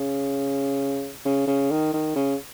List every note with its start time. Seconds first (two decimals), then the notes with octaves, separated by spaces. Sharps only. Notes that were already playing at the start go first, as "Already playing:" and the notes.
Already playing: C#3
1.25 C#3
1.47 C#3
1.71 D#3
1.93 D#3
2.16 C#3